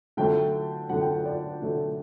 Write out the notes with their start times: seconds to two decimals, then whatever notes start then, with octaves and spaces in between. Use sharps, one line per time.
0.17 D3 F#3 A3 G5
0.89 D3 F#3 A3 F#5
1.01 G5
1.12 F#5
1.25 D5
1.62 D3 F#3 A3